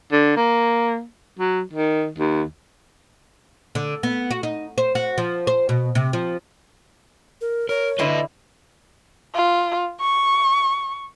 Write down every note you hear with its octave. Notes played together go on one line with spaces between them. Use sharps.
D3
A#3
F#3
D#3
D#2
D3
B3
F#4
D#4
C5
F#4
F3
C5
B2
C3
F3
A#4
A#4 C#5
D3 E4 B4 D#5 C6
F4
C#6